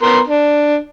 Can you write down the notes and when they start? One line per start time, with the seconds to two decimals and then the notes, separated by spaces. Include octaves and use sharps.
0.02 B3 A#4 C6
0.27 D4